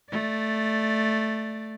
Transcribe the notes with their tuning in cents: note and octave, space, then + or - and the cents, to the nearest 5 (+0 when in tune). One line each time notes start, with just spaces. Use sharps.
A3 +0 D5 +10